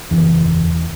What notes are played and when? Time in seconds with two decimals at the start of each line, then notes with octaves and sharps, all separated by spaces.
0.11 F#1 E2 E3